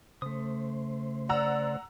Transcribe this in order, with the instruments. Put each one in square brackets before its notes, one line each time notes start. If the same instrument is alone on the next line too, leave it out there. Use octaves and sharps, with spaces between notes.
[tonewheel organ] C#3 C5 [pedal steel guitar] A3 D#6
[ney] D5 [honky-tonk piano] F#5 A#5 E6